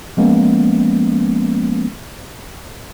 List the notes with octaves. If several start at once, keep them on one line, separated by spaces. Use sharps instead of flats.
F3 G#3 A#3 B3 C#4